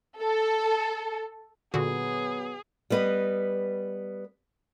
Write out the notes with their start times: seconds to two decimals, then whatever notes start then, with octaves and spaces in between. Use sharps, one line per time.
0.20 A4
1.74 A#2 D3 F#3 B3 F#4 G#4
2.90 G3 B3 B4 D#5